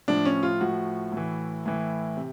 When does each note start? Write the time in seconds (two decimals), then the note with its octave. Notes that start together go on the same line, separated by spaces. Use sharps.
0.08 A2 F3 D4
0.25 C#4
0.43 F4
0.60 A2 F3 F#4
1.12 A2 E3
1.65 A2 E3
2.17 C3